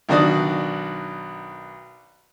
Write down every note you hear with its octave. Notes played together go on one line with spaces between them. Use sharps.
B1 D#3 D4 F#4 D5 D#6